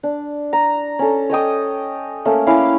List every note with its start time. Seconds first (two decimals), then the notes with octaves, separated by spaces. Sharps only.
0.03 D4
0.53 A#5
0.99 C#4 A4
1.29 C#5 D#5 G5 D#6
2.25 A3 A#3 C#4
2.47 C#4 E4 F5 D6